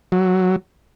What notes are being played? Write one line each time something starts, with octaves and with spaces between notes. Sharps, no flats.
F#3